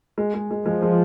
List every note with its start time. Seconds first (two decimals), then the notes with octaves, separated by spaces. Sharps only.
0.18 G#3
0.34 G#3
0.51 G#3
0.66 F3 G#3
0.82 G#3